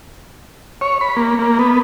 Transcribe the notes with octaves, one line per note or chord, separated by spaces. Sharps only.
C#5
B5
A#3
A#3
B3